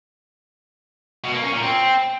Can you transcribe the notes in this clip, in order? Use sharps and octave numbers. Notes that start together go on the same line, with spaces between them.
B2
A#3
C#4
A#2
C4